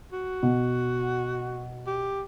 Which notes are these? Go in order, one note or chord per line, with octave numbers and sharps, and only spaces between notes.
F#4
B2
G4